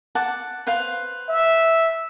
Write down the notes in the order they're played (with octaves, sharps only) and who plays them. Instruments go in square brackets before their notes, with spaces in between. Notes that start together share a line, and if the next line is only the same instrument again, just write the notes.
[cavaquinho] F#5 A5 D6
B4 C5 F5
[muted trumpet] E5